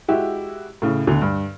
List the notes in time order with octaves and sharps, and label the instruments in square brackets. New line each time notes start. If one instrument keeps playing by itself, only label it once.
[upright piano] G#3 E4 F#4 G4
A2 C#3
D2 B2 D3
G2